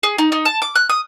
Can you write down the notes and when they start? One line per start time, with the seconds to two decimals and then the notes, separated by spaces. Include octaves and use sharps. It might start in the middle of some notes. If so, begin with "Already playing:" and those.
0.03 G#4
0.18 D#4
0.32 D#4
0.45 A5
0.62 D6
0.75 F#6
0.89 D#6